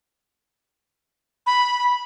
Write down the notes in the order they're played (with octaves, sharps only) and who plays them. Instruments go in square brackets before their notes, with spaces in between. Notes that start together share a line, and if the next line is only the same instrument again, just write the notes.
[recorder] B5